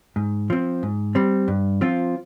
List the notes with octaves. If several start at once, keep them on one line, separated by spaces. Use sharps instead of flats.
G#2
F3 C4
G#2
G3 C4
G2
F3 C4 F4